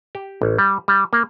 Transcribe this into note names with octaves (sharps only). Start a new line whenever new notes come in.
G4
A1
G3
G3
A#3